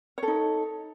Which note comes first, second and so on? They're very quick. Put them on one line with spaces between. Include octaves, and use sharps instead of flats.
C#5 A4 D#4